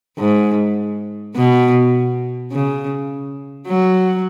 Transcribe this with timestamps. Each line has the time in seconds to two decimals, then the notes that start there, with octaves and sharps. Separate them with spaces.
0.19 G#2
1.36 B2
2.52 C#3
3.68 F#3